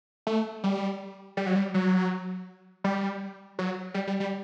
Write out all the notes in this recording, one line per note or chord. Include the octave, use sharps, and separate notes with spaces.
A3
G3
G3
F#3
G3
F#3
G3
F#3
G3
G3
G3